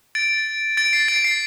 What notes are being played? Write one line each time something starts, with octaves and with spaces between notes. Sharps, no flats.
A6 D7
A6 D7
C7
A6 D7
C7